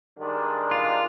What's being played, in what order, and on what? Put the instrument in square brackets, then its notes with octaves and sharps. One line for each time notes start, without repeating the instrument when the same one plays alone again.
[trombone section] G2 D#3 G#3 D4
[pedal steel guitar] F4